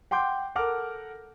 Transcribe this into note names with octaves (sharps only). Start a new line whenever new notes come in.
F#5 G5 C6 D6 G6
A4 A#4 F#5 D6 F6